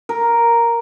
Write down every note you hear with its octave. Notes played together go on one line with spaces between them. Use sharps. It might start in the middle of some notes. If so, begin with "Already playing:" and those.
A#4